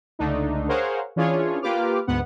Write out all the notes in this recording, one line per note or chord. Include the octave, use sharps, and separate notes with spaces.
C#2 D3 A3 D4 D#4
G#4 A#4 C5 C#5 F5 F#5
E3 C#4 D4 F4 G#4 C#5
A#3 F4 G4 B4 D6 F6
D2 G#2 B3 F#5